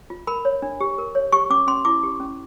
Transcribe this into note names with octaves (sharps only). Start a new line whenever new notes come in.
F4
A#4 B5
C#5
D4
G4
A#4
C#5
G4 C#6
C#4 D6
C#4 C6
E4 D6
G4
C#4